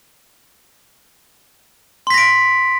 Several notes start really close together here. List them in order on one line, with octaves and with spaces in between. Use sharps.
C6 B6 A#6 D7